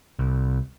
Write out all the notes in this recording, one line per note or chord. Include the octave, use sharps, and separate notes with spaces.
C2